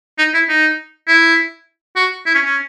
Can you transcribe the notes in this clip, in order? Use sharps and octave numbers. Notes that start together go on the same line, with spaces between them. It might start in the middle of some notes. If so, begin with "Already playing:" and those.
D#4
E4
D#4
E4
F#4
E4
C#4
C#4